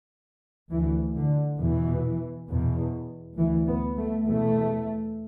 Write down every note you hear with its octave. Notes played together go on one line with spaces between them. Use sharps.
D2 E3
D3
E2 B2 E3
E2 B2
D2 E3
B3
A3
E2 B2 A3